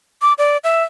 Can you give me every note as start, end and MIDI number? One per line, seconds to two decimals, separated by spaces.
0.22 0.33 86
0.38 0.57 74
0.64 0.84 76